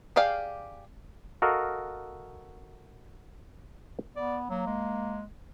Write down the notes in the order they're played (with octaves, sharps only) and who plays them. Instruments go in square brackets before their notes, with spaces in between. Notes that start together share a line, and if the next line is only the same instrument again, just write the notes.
[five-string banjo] G4 G#4 D5 F5 G5
[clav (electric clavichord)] F#4 A4 A#4 D#5 F5
[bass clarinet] B3 [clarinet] D5
[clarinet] F#3 [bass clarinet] A#3
[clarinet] G#3